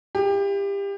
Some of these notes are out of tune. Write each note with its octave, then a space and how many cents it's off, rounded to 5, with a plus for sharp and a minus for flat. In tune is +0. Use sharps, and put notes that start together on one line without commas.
E4 +35 G4 +25